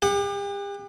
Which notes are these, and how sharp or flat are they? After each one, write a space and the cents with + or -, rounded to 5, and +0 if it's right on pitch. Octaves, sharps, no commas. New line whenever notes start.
G4 +40 F#5 +0